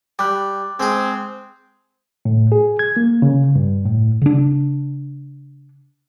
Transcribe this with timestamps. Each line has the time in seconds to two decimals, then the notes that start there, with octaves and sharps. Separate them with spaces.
0.19 G3 D6 F#6
0.80 G#3 C4 G#4
2.25 A2
2.52 G#4
2.79 G#6
2.97 A#3
3.22 C#3
3.55 G2
3.85 A2
4.22 C#3 D4